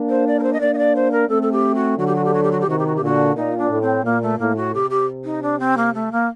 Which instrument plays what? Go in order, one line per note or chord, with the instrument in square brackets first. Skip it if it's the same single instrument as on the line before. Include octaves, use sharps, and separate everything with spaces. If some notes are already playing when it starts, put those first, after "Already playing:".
Already playing: [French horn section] A#3 D4
[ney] C5
D5
A#4
C5
D#5
[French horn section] A#3 D4 [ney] D5
[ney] D#5
D5
C5
A#4
[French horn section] A3 C4 [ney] A4
[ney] A4
G4
F#4
[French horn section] D3 F#3 [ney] F#4
[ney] G4
F#4
G4
F#4
G4
F#4
G4
[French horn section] C3 D#3 [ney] F#4
[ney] G4
F#4
G4
[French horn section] A#2 D3 [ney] F#4
[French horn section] A#2 [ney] D#4
[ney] D4
[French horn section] A2
[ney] C4
[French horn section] A#2 [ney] A#3
[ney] A3
[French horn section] A2 [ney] A#3
[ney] F#4
[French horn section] C3 [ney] G4
[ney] G4
D#4
D4
C4
A#3
A3
A#3